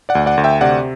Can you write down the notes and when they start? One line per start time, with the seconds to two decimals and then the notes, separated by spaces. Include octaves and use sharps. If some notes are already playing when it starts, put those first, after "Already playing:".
0.09 D5 F#5
0.15 D2
0.26 D5 F#5
0.37 D2
0.44 E5 G5
0.61 C3 D5 F#5